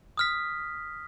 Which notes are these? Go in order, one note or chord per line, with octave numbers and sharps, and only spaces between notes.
D#6 F6 B6